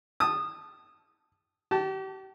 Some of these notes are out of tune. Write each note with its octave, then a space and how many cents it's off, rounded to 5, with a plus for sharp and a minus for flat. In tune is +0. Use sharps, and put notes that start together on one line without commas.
A5 +0 D#6 -20
G4 -35 A5 +0